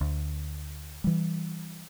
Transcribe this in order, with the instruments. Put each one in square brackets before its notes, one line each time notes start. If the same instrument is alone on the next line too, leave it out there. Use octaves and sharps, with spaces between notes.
[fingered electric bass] D2
E3 G3